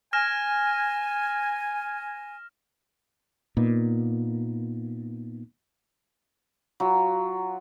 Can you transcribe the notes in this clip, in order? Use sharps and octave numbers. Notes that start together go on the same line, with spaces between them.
G#5 F6 A#6 E7
A#2 A#3 B3 D#4
F#3 F4